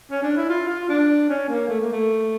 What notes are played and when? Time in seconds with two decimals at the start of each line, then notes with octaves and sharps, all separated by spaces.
0.11 C#4
0.23 D4
0.37 E4
0.49 F4
0.69 F4
0.89 D4
1.30 C#4
1.49 A#3
1.69 A3
1.81 A#3
1.93 A3